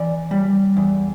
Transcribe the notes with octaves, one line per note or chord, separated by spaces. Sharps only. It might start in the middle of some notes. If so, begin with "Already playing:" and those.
Already playing: E3 D5
G3
E2